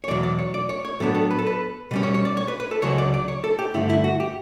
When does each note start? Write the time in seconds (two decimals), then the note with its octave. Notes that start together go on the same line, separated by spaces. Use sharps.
0.04 C#5
0.08 E2 B2 F#3 D5
0.23 D5
0.39 C#5
0.54 D5
0.69 C#5
0.85 C#5
1.00 A2 F#3 B3 D4 A4
1.15 A4
1.31 B4
1.39 A4
1.47 B4
1.91 B2 G3 C#4 B4
2.03 C#5
2.14 C#5
2.25 D5
2.37 C#5
2.48 B4
2.60 B4
2.71 A4
2.82 C#2 C#3 F#3 C#5
2.98 D5
3.14 D5
3.28 C#5
3.44 A4
3.59 G4
3.74 G2 D3 A3 E4
3.90 E4
4.04 F#4
4.20 G4